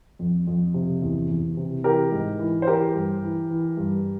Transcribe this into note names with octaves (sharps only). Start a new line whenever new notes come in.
F2
F2
C3
E2
E2
C3
E3 G4 A#4
G#2
E3
C5
E3 G4 A#4
G2
E3
E3
G2